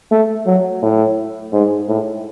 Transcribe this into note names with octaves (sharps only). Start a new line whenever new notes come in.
A3
F#3
A2
G#2
A2